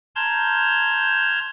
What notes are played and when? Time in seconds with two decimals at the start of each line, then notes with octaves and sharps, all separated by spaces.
0.16 A5 A#5 C6 F6 G6 G#6